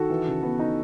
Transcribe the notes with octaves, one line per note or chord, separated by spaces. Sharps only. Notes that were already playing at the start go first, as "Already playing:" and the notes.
Already playing: D#3 F#4 A4
E3
C#3
B3
D#4